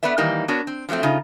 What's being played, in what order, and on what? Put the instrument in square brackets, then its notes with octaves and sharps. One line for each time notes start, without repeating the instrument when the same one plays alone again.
[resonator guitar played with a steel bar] B3 A4 B4 D5 E5
D#3 E3 G3 A#3 D#4
B3 D4 F#4 A#4 C#5
C4
F3 F#3 G#3 A3 C4
C#3 D#4 F4